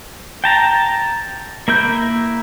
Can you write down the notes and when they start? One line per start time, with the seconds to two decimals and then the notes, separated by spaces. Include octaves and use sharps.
0.44 G5 A5 A#5
1.68 A#3 E4 A#4 G6